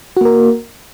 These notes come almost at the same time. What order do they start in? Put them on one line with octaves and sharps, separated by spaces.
F#4 A#3 A#4